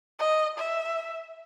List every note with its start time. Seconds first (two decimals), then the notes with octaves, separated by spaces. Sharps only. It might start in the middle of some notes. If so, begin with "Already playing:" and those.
0.19 D#5
0.58 E5